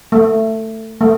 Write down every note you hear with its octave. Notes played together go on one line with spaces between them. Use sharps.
A3
A3